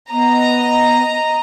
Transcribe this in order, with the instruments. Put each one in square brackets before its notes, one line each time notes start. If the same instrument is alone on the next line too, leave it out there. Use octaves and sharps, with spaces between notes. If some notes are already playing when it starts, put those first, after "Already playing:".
[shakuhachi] B3 [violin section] D#5 A#5